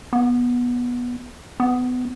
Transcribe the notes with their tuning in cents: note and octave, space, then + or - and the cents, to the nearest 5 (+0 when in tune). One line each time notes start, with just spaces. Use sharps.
B3 -15
B3 +25